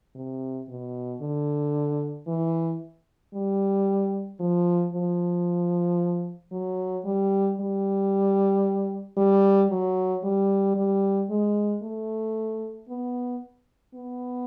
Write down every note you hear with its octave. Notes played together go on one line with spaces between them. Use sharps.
C3
B2
D3
E3
G3
F3
F3
F#3
G3
G3
G3
F#3
G3
G3
G#3
A3
B3
B3